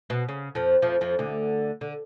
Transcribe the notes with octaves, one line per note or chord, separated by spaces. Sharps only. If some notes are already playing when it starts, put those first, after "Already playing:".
B2
C#3
F2 F3
F2 F3
F2 F3
D2 D3
D3